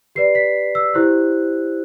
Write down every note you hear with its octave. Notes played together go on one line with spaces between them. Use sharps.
G4 B4 D5 C7
B6
E6
E4 G4 C5 F#6